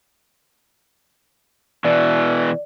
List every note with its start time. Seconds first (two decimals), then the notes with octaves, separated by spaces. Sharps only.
1.85 B2 E3 D5